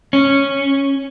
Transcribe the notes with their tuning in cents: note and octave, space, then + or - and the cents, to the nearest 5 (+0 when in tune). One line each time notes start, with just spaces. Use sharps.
C#4 -5